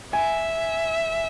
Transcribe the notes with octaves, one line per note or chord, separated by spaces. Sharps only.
E5 G#5